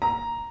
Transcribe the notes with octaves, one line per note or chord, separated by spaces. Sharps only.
A#5